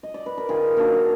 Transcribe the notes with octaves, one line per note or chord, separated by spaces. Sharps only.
D#5
D5
B4
A#4
D#3 F4 G#4
A#3 D4 F#4 A#4